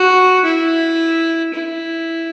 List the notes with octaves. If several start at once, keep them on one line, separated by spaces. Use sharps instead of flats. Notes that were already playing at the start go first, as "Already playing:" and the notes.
Already playing: F#4
E4
E4